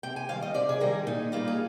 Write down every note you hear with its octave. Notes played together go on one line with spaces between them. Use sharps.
C3 G5
G#5
D#3 G3 F5
D#5
C3 D5
G#4
D#3 G3 A#4
A#2 D#4
G3 A#3 D#4 F4
G#4